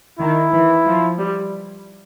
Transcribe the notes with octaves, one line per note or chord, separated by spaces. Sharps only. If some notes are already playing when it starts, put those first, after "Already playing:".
D#3 E4
E3
F3
G3